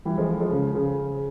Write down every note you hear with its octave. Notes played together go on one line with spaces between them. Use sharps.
E3 G3
F3 G#3
F3 G#3
C#3
C#3